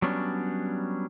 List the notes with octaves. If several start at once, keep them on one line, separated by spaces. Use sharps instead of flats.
F#3 G3 B3 C#4 D4